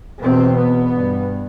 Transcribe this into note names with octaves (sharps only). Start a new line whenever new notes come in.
E2 B2 C4
B3
G2